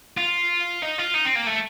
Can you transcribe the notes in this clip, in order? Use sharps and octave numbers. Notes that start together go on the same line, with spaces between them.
F4
D#4
F4
D#4
C4
A#3
A3